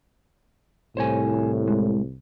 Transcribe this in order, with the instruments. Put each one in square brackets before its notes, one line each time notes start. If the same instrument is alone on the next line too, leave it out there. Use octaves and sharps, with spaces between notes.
[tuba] C2 [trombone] A2 [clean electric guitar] C5 C#5 G#5
[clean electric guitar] G#3